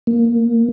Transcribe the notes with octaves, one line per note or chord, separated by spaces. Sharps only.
A#3